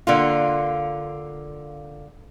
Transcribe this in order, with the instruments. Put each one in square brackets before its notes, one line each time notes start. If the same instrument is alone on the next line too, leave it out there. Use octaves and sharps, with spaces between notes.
[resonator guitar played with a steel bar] D3 A#3 F4